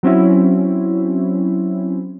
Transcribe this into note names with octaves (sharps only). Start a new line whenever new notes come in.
F#3 C4 C#4 E4